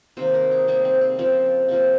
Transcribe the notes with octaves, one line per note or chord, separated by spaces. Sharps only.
C3 D#3 A#3 C5
A#4
G#4
C3 G3 A#3 G#4
C4
C4
C#3 F3 G#3 C4
C3 F3 A#3